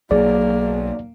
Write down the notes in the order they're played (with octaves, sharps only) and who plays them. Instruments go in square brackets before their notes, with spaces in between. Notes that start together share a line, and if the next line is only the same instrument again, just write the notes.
[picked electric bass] B1 F#3 [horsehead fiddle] A#3 [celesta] G#4 [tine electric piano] D5